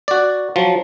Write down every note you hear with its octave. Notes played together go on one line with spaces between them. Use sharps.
F#4 D5
F3 F#3